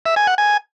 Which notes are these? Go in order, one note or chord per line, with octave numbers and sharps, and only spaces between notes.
E5
G#5
F#5
G#5